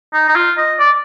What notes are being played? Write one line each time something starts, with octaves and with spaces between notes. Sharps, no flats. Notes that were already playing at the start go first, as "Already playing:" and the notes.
D#4
D#4
F4
D#5
D5